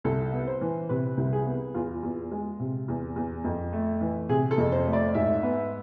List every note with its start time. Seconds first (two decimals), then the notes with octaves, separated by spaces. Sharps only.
0.04 C2 A4
0.33 B3
0.47 C5
0.61 E3
0.89 C3 B4
1.17 C2
1.33 G#4
1.46 B3
1.74 E2 F4
2.03 E2
2.31 G#3
2.59 C3
2.88 E2
3.16 E2
3.44 F2
3.73 A3
4.01 E3
4.29 C3 G#4
4.51 A4
4.58 F2
4.72 C5
4.86 A3
4.93 D5
5.14 G#2 E5
5.43 B3